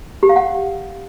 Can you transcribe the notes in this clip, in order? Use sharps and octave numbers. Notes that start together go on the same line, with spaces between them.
G4
F5
F#5